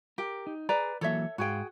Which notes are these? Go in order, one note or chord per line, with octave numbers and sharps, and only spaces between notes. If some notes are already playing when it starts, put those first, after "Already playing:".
G4 A#4
D#4
G#4 B4 D5 A#5
E3 F#3 A#3 A4 C#5 E5
G#2 F#4 G#4 F5 G5